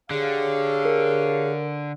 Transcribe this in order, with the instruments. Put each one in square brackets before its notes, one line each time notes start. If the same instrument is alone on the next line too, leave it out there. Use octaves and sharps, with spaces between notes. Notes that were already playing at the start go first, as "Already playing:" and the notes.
[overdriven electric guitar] D3 [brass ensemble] G4 C#5 F5 [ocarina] G#4
[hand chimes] A#4